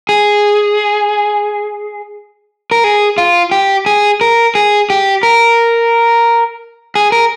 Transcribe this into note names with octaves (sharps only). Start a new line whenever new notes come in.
G#4
A#4
G#4
F4
G4
G#4
A#4
G#4
G4
A#4
G#4
A#4